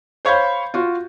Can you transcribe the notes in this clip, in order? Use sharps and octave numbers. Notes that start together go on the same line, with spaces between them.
C5 C#5 F5 B5 G6
F4 F#4